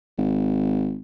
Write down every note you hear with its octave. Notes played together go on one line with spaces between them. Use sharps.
G#1